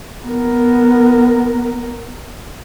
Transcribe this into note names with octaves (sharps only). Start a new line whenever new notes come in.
B3 A#4